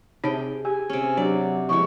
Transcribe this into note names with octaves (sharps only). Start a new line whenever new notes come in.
C3 D#4 G#4 C#5 G5 A5
G4 G#5
C3 C#4
F#3 D4 G4 D5
B2 F3 G#3 E4 C#6